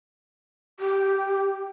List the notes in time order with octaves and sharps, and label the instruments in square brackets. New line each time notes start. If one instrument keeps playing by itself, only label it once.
[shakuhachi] G4